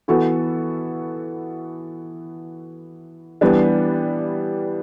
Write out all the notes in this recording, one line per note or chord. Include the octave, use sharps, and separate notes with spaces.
E3 B3 F#4 A4
E3 G3 B3 D4